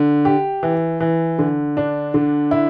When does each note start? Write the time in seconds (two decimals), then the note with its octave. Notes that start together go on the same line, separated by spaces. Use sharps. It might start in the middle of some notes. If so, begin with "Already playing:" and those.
Already playing: D3
0.25 G4
0.63 E3
1.00 E3
1.39 D3
1.77 D4
2.14 D3
2.51 E4